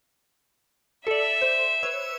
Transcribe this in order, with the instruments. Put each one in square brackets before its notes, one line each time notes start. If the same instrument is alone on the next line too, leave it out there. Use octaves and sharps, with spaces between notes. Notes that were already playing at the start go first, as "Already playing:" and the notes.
[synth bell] A4 D5 [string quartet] E5
[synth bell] C5
B4 C#5 E6